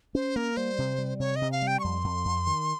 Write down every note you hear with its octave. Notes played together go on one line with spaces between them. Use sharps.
C#4 C5
A#3 A#4
G3 C5
C3
G3
C3 C#5
D#5
C3
F5
G3
G5
C#6
F2 C6
F2
F2
D#3